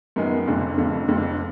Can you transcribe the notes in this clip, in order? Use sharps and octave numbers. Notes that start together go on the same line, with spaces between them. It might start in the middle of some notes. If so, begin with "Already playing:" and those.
F#2 D#3 G#3 B3
F1 F2 D3
F1 F2 D3
F1 F2 D3